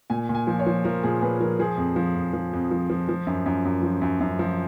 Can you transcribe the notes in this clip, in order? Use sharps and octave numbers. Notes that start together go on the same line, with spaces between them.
A#2 G#5
A#2
G#5
F3
C#5
F3
F3 A#4
A#2 G#4
A#2 B4
F3 A#4
F3 G#4
F2
F3
F2
F3
F2
F3
F3
F3
F#2
F#2
F#2
F3
F#2
F#2
F3